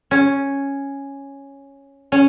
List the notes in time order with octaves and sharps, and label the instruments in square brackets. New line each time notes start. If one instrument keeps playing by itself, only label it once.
[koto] C#4
C#4